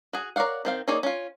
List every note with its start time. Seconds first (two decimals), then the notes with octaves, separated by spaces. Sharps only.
0.13 F#4 G#4
0.36 A#4 C#5 D5 F5 F#5
0.65 D#3 C4 F5
0.88 A#3 D#4 G#4 C#5 D5
1.03 C#4 F4